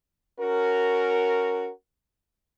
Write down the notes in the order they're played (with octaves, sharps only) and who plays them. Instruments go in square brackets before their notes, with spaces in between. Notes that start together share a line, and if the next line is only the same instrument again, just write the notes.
[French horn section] C#4 F#4 A#4